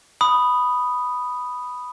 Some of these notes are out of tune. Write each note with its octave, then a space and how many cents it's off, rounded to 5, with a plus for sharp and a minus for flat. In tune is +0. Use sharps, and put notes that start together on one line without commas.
B5 +0 D#6 -5